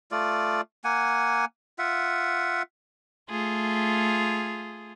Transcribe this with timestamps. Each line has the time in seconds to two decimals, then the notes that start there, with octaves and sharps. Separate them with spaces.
0.12 A3 F4 D5
0.85 A#3 F#5 G#5
1.79 F4 E5 F#5
3.30 A3 F4 G#4